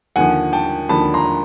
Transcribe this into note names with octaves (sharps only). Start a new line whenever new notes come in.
D#2 D3 F3 F#5 G#5
G5 A5
D#2 D3 F3 A5 B5
A#5 C6